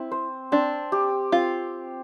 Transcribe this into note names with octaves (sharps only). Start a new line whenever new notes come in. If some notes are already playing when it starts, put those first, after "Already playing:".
Already playing: C4 E4
C5
C4 D4
G4
C4 F4